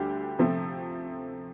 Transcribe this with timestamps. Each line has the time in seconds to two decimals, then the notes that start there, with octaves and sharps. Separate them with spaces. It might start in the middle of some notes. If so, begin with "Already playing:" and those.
Already playing: D2 D3 G3 G4
0.39 C3 F3 A3 C4